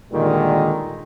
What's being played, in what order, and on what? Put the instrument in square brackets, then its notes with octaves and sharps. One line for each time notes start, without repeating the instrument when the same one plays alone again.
[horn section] A#2 D3 D#3 G3 G#3